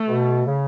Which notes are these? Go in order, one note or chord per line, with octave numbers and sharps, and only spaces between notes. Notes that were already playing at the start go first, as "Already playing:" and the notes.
Already playing: A3
B2
C#3